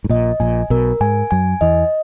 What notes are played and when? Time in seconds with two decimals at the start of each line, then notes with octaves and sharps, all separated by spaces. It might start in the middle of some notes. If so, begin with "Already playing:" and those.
0.04 G#2
0.09 A#1 A#2 D#5
0.40 A#1 A#2 G#5
0.70 B1 B2 A#4
1.00 G#2 G#3 G#5
1.31 F#2 F#3 G#5
1.61 E2 E3 D#5